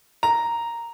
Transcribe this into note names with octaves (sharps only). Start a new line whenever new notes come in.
A#5